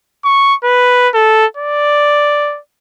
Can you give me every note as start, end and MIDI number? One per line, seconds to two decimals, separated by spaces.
0.25 0.55 85
0.64 1.09 71
1.14 1.46 69
1.57 2.59 74